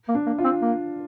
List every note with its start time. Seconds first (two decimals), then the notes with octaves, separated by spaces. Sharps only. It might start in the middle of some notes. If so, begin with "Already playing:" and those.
0.09 A#3
0.15 D4
0.26 A#3
0.38 F4
0.44 C4
0.62 A#3